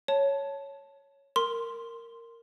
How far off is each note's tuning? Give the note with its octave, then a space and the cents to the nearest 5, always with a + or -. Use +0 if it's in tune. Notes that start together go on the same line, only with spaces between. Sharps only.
C#5 +0 A5 +0
A#4 -10 C6 +0